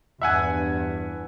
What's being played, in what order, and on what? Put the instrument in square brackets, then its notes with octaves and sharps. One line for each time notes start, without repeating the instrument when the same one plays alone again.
[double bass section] E2 G2 [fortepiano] E5 F#5 G#5